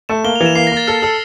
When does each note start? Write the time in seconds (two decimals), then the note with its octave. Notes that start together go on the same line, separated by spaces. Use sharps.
0.09 A3 E7
0.24 A#3 G7
0.36 F7
0.41 E3
0.46 E7
0.55 A#3 C7
0.67 A#6
0.72 A#3
0.77 A6
0.87 A4 F6
1.02 A4 E6